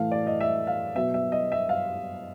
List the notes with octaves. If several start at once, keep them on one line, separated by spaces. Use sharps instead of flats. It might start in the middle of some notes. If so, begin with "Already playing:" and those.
Already playing: A2 E3 A3 F5
D5
D#5
E5
F5
B2 F#3 B3 E5
E5
D#5
E5
F5